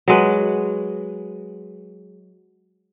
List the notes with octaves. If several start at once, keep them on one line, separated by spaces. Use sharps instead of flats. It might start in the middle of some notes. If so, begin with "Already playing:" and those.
F#3 G#3 B4